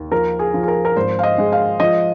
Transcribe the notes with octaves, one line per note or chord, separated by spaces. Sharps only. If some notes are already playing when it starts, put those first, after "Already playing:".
Already playing: D#2
F3 A#4
G#4
F3
G#4
A#4
A#4
G#1 C5
F5
D#5
G#3
F5
F3 D#5